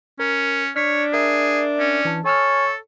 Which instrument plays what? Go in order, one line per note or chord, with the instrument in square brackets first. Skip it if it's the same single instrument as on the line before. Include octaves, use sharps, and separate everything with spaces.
[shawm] C#4 [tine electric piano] A#4
[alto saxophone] D4 [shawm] C#5 [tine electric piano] F6 B6
[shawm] G#4 [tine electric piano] A#4 E5
[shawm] C#4
[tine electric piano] E3 A5
[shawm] A4 [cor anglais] C#5 [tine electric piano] G#5 E6 F6